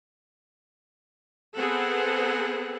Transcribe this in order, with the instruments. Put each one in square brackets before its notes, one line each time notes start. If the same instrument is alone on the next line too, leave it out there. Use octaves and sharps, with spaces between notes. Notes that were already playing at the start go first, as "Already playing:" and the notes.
[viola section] B3 C4 G#4 A4 F#5